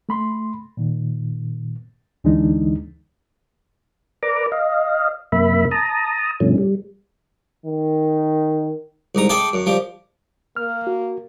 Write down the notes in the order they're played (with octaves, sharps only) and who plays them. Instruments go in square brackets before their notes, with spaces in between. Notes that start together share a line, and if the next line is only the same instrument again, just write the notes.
[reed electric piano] A3 B5 C6
A#2 D#3
D2 D3 E3 G#3 D4 D#4
[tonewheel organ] A#4 B4 D5 A#5 D6
D#5 F5
F#2 C3 A#3 E5 B5
A5 A#5 D#6
G2 B2 D3 F3 A3 C#4
G3
[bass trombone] D#3
[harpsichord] C2 G#2 A#5
G#4 A4 D5 E5 G5
F#2
F3 G3
[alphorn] A#3 [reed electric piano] F6
[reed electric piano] F#4